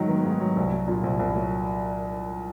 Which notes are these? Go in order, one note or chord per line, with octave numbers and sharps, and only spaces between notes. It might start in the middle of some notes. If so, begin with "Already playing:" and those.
Already playing: G#2 D#3 F#3 A3
B3
G#2
F#3
C2
F#3
A#2
C2
C2
F#3